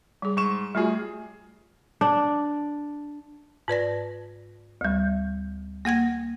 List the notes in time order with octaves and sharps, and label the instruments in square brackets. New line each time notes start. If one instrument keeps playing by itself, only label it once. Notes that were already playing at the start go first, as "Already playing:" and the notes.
[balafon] G3 G#4
[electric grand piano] G#2 C#6 E7
[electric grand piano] G3 G#4 [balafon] A3 F4 F#4
[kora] D4
[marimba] G#2 B4 D5 A#6
D2 G3
A#3 F#5 G#6 A#6